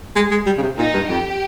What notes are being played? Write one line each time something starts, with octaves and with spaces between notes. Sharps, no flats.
G#3
G#3
G3
C#3
C3
A#2 D#4
G2
F2 G4